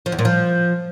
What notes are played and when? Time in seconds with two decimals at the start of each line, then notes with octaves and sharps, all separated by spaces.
0.06 F3
0.12 E2
0.19 A#2
0.25 F3